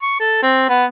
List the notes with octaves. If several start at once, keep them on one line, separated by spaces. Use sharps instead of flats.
C#6
A4
C4
B3